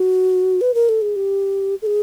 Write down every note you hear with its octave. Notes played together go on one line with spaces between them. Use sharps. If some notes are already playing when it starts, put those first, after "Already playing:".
Already playing: F#4
B4
A#4
A4
G#4
G4
A4
G#4